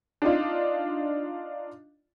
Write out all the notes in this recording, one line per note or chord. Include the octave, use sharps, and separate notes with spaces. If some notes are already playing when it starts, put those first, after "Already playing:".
D4 D#4 F4